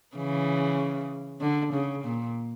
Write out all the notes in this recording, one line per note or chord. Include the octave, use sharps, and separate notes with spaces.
C#3 E3
D3
C#3
A#2